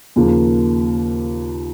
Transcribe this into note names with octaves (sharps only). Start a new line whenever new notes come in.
D#2 C#3 F3 A#3